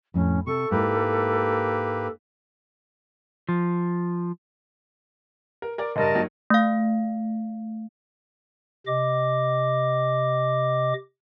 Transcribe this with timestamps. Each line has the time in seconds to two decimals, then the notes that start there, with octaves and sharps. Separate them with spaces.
0.14 F2 A2 C#4
0.47 C3 A4 C#6
0.71 G#2 G#3 A#3 E4 G4 B4
3.49 F3
5.62 A#4
5.78 A#4 D5
5.96 F#1 G2 A#4 D#5 A5
6.15 D#3 F#3 A#3
6.50 A3 F5
8.87 C3 D#5 D6